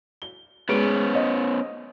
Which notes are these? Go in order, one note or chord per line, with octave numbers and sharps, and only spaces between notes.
G7
G#3 B3 C#4 B4 D7
D#5